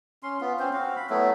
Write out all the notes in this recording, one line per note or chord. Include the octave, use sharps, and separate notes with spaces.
C#4 C6
B3 F4
C4 C#4 C5
C4 F#4 F5
B5
F#3 A3 B3 E4